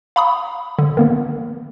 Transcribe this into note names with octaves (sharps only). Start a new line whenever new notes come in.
F5 A#5 B5 C#6 D#6
D3
D#3 A#3 B3